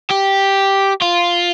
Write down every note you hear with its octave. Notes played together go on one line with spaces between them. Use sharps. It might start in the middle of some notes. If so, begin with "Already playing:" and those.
G4
F4